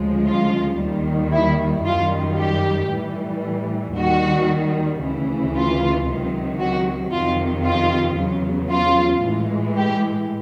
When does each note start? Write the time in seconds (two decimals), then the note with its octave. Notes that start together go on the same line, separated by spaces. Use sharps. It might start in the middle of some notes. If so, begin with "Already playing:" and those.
Already playing: D2 C#3 F3 G#3
0.26 F4
0.78 D#2 D#3 G3
1.32 E4
1.84 F#2 D#3 G3 F4
2.37 G4
2.90 A2 E3 G3
3.96 D#2 D#3 G3 F#4
5.02 D2 C#3 E3
5.55 F4
6.07 C#2 C3 D#3 F#3
6.60 F#4
7.12 F2 C3 D#3 F4
7.65 F4
8.18 E2 C#3 F#3
8.71 F4
9.24 A2 E3 G#3
9.77 G4